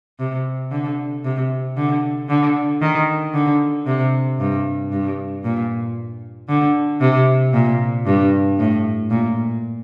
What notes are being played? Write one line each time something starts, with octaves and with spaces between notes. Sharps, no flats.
C3
D3
C3
D3
D3
D#3
D3
C3
G2
G2
A#2
D3
C3
A#2
G2
A2
A#2